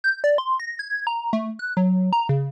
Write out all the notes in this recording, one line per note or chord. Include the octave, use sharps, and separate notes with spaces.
G6
D5
C6
A#6
G#6
A#5
A3
F#6
F#3
A#5
C#3